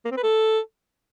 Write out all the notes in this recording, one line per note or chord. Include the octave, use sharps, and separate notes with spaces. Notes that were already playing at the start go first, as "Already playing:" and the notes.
A#3
C4
B4
A4